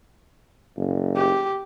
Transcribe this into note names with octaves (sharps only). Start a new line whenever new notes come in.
F#1
G4